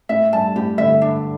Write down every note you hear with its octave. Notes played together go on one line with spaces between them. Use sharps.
A2 E5
G2 A5
A2 G4
A2 D3 E5
D4